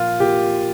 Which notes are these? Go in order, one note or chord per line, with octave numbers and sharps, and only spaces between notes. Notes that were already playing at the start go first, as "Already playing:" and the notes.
Already playing: A#2 F3 F4
A#2 G4